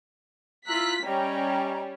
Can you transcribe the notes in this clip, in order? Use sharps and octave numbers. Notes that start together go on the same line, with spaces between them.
E4 F4 A#5 E6 F#6 B6
G3 C#4 D#5 G5 A#5